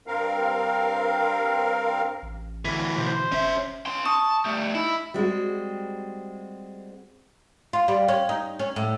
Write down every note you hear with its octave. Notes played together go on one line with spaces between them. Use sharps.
G2 C4 A#4 F5
A1
D2 E3
B2 C5
F#1 C#4 E5
C#4 C6
A5 C#6 D#6
G3 A3
D#4 E4
G3 G#3 C4 F#4
F4
G3
C#4
D#4
C#4
A2